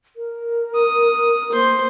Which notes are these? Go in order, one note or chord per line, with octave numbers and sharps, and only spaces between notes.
A#4
D#6
A#3 C5